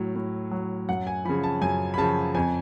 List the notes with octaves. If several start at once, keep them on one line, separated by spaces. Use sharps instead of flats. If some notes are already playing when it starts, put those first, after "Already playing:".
Already playing: A2 F#3
A2
F#3
F#2 F#5
G#5
C#3 F3 B5
A5
F#2 G#5
B5
C#3 F3 A5
F2 G#5